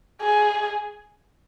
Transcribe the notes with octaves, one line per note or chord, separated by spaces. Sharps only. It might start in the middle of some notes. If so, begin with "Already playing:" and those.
G#4